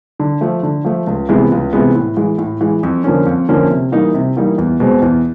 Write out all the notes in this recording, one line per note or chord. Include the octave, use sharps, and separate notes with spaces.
D3
F3 A3
D3
F3 A3
C#2
C3 E3 G#3 B3
C#2
C3 E3 G#3 B3
A2
E3 G#3
A2
E3 G#3
F2
D3 F3 A#3 C#4
F2
D3 F3 A#3 C#4
C3
E3 G3 A#3 D#4
C3
E3 G3 A#3 D#4
E2
B2 G#3 C4
E2